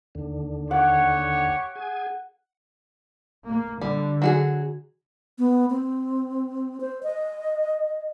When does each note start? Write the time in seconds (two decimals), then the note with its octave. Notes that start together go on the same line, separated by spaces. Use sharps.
0.15 D#2 D3
0.71 G4 C#5 F#5
1.75 G#4 G#5
3.47 A#3
3.81 D3 G3
4.22 F#3 F#4 G#4
5.38 B3
5.70 C4
6.80 C5
7.03 D#5